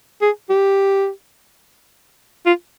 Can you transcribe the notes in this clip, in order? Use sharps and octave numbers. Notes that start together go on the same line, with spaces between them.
G#4
G4
F4